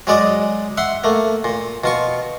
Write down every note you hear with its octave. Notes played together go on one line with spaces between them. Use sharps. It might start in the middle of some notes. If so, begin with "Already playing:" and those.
F#3 G#3 D5 D#5
E5 F#5 C6
A3 A#3
A#2
B2 F4 C#6